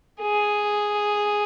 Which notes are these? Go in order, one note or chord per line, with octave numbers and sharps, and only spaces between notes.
G#4